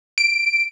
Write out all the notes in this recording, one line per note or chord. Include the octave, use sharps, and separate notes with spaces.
D7